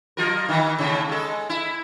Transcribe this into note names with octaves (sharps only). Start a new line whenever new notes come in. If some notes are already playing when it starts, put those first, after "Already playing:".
F#3 F4 A#4
D#3 E3
D#2 A2 C#3
G#3 A4
E4